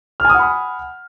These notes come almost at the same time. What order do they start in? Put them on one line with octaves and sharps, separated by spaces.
F6 G#5 D#6 F#5 B5